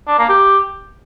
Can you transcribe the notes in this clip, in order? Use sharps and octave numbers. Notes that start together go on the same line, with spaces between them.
D4
A#3
G4